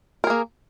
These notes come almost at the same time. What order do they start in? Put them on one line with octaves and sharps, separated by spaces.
A#4 G#4 A#3